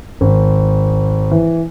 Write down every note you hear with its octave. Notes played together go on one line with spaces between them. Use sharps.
G#1
E3